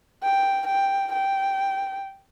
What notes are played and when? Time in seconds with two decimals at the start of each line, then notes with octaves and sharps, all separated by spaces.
0.23 G5
0.67 G5
1.12 G5